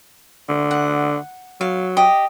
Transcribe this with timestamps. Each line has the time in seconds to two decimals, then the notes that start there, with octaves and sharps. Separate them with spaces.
0.49 D3
0.71 F#5
1.61 F#3 F5
1.97 G4 D#5